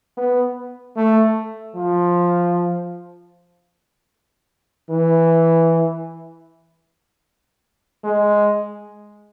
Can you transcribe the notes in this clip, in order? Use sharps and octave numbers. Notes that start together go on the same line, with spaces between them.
B3
A3
F3
E3
G#3